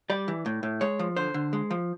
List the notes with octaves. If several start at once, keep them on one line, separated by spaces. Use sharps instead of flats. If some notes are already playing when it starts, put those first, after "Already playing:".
G3 D5
E3
A2
A2
G#3 C#5
F3
D3 C5
D3
G#3
F3